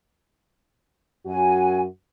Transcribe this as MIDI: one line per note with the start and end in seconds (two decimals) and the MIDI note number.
1.27 1.86 42
1.27 1.86 66
1.27 1.80 80